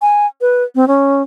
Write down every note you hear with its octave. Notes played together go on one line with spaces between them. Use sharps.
G#5
B4
C4
C#4